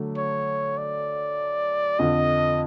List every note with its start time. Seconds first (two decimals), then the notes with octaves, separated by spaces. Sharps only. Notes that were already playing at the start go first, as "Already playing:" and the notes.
Already playing: D3 F#3 A3
0.18 C#5
0.78 D5
1.99 F2 D3 F3 D#5